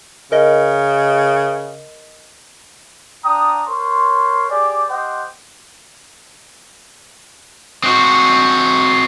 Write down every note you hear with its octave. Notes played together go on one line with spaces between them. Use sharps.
C#3 A#4 D#5
D4 G5 A#5 D#6
A#4 C5 C#5 C6
G4 G#4 D5
G4 C5 D#5 F#5 G5
C4 F#4